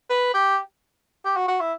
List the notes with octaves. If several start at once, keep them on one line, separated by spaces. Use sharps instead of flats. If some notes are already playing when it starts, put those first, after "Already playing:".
B4
G4
G4
F#4
F#4
E4